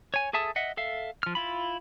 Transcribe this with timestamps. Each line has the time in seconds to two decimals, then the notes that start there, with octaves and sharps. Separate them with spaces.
0.14 C#5 G#5
0.33 G#4 A4 E5 A5 D#6
0.56 D#5 E5 F#5
0.77 A4 E5 F5
1.23 F3 F6
1.35 E4 F4 B5